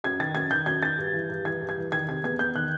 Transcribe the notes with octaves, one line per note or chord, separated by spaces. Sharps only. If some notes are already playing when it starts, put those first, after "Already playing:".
F#2 G#6
D#3 A6
F#2 G#6
D#3 G6
F#2 G#6
D#3 A6
G2
E3
G2
E3 G#6
G2
G#6
E3
D#3 G#6
C3 G#6
E2 G#6
E2 G6
D#3 F#6